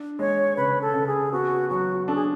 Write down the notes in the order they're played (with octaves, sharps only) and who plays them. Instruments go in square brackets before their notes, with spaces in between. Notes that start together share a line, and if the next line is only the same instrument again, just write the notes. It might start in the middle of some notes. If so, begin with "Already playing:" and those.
Already playing: [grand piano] D4
[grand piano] G#3 [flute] C#5
[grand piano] C#3 [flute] B4
[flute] A4
[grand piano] C#3
[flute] G#4
[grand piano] B3 [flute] F#4
[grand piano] F#3 [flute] F#4
[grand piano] D4 [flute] A4
[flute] G#4